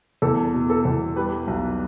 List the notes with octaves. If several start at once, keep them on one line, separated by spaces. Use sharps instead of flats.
E2 A4
B2
A4
E2
G3 B4
B1